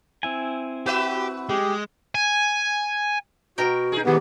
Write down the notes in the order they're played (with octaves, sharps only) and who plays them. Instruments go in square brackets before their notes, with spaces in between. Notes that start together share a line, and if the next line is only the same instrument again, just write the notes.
[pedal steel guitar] C4 E4 G#5
[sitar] F#4 B4 E5 [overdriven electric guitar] G4
[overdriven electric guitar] G#3 [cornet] G4
[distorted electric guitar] G#5
[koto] B2 A#4 G5 [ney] F#4
[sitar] D#4 G#4
[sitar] G#2 D#3 [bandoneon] B3 [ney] G4